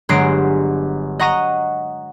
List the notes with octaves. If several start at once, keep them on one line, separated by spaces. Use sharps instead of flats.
G1 F#3 G#3 A#5 C7 D7
D#5 F#5 A#5 C#6 A#6 D#7